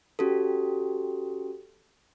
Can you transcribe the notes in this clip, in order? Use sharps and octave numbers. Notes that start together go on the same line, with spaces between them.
C#4 F#4 G4 A4